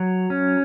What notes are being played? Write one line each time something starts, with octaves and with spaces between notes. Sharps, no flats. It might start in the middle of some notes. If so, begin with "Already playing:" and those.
Already playing: F#3
C#4